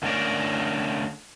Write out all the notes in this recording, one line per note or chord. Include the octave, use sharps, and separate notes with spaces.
D3 A3 C#4 G#4 A#4 D5